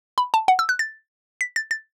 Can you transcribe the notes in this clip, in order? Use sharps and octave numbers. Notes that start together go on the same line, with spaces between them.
B5
A5
F#5
E6
F#6
A6
B6
A6
A6